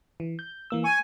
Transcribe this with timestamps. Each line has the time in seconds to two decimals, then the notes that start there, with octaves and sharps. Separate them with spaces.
0.20 E3
0.39 G6
0.70 E3 A#3 E6
0.84 G#5 C#6